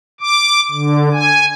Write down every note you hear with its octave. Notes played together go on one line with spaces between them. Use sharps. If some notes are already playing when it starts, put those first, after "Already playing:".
D6
D3
G#5